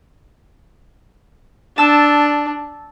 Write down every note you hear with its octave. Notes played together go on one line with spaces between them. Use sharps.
D4 A5 E6